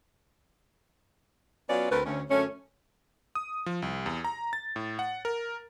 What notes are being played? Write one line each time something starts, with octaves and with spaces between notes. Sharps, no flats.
F#3 B3 C#4 F4 C#5 D5
D2 A3 C4 A#4 B4
D2 C#4
F#2 D3 A3 C#4
D#6
F3
C2
E2
A#5
A6
A2
F#5
A#4